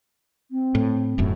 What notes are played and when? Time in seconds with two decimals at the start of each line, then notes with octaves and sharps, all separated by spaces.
0.51 C4
0.75 A2
1.18 D1 F#2 A2